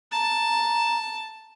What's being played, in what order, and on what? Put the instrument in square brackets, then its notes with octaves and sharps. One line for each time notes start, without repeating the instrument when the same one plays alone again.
[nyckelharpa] A5 [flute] A#5